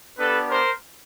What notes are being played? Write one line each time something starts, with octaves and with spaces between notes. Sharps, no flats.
B3 D4 G4 A4 B4
A#4 C5